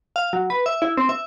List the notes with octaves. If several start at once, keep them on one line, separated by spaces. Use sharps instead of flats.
F5
F#3
B4
E5
E4
C4
E5